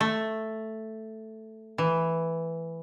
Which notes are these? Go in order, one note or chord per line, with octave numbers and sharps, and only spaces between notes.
A3
E3